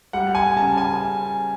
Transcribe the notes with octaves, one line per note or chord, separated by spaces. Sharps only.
G3 F#5
G#5
C#3 A5
G#5